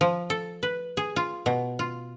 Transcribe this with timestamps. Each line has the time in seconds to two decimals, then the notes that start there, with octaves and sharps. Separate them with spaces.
0.01 F3
0.30 A4
0.63 B4
0.97 G#4
1.16 F4
1.46 B2
1.79 F4